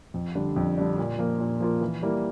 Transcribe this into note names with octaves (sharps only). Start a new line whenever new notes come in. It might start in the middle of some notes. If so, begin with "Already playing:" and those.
F2
D3 G3 D4
F2
D3 G3 D4
A#2
F3 A#3 F4
A#2
F3 A#3 F4
E3
G3 A#3 E4